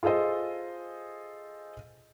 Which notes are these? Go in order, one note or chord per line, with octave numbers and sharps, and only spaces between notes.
F4 G#4 A4 C5 D#5